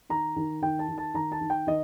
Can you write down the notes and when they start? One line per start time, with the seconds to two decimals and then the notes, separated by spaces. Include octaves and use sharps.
0.09 D#3 A#5
0.36 D#3
0.62 D#3 G5
0.79 A5
0.88 D#3
0.98 A5
1.14 D#3 A#5
1.32 A5
1.41 D#3
1.50 G5
1.67 D#3 D#5